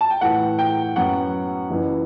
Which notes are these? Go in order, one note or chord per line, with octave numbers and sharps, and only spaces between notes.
A5
G5
A2 E3 A3 F#5
G5
F#2 F#3 B3 F#5
F#1 F#2 E3